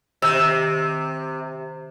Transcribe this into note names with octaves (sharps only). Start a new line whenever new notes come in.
C3 D#3 E6